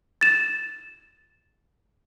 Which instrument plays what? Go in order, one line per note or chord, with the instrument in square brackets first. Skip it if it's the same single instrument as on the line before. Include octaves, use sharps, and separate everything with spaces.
[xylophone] A6 E7